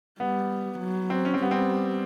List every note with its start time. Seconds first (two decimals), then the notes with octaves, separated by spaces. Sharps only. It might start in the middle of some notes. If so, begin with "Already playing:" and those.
0.20 G3 B3
0.79 F#3
1.10 C4
1.25 C#4
1.34 C4
1.39 G3 B3
1.51 C4